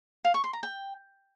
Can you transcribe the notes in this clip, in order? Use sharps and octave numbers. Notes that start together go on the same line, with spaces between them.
F5
C#6
C6
A#5
G5